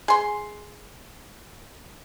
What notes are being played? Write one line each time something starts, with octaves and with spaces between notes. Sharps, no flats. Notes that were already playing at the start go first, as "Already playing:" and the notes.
G#4 C6